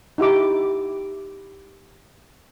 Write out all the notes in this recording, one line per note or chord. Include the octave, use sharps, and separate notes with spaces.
D#4 E4 G4 D6